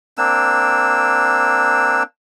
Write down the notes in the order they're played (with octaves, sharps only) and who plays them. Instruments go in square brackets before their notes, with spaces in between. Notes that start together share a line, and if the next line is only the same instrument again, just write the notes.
[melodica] A#3 C4 D4 E6